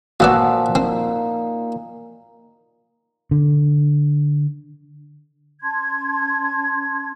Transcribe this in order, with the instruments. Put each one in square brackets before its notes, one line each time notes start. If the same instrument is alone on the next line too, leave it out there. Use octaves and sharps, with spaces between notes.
[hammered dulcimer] A#2 F3 [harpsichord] A#3 B3 D5 [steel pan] F#4 F#5 E6
[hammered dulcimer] A#3 D#4 [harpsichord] C4
[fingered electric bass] D3
[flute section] C#4 A5 C6 G#6